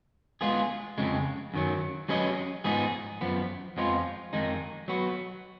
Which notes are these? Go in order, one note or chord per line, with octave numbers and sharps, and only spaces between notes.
G#3 B3 F4 G#4
F2 C#3 G#3
F#2 D#3 F#3
F#3 C#4 G#4 B4 D#5
G#2 F3 B3 D#4 G#4
F#2 F3 B3
F2 F3 G#3 B3 F4
F2 D#3 G#3 D#4
F#3 B3 F#4